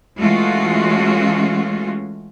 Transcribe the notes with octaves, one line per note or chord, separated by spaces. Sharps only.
E3 G#3 A3 C#4 F4 F#4